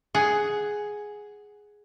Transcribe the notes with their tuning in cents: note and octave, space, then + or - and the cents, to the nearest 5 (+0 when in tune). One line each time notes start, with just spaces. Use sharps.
G#4 +5 F#5 +10